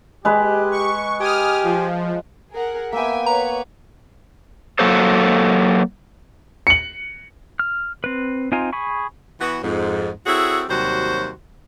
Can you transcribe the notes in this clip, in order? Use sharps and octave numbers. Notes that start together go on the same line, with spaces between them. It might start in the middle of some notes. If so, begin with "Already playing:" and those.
G#3 G4 B4
C#6
G4 G#5 D#6 F6
F3
G#4 A#4 F#5
A#3 B3 E5 G5 G#5
B4 C#5 A#5
F#3 A#3 A4 C5
C#7 F#7
F6
C4 B4
C4 D#4 F4 G#5 A#5
G#4 G#5 B5 C#6
E3 B3 F#4
F2 G#2
C4 E4 F#4 G#4 A4 C#5
D#2 C3 F#3 G3 F#4 C5